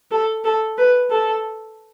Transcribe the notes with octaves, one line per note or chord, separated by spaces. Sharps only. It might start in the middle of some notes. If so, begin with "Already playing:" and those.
A4
A4
B4
A4